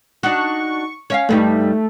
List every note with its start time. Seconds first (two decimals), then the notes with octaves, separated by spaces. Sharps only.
0.23 D4 D#4 F#4 C#6
1.10 C#4 E5 F5
1.29 G2 G3 A3 D#4